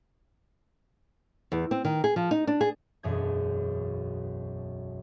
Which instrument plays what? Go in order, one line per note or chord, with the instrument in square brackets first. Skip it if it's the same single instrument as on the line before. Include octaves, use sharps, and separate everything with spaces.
[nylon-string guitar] E2
C4
D#3
G#4
F3
D#4
D4
G#4
[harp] E1 B1 F#2 G#4 G#6